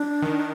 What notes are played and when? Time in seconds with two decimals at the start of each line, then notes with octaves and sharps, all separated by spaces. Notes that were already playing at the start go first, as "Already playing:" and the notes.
Already playing: D4
0.22 D#3